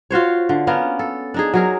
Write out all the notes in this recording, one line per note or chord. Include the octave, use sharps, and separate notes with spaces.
F4 F#4 C5 C#5
D3
A#3 B3 C#4 A#4
A4
D4 D#4 G#4
F#3 G#4 A#4